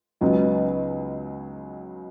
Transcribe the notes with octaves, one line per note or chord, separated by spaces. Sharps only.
C#2 C#3 F#3 B3 D#4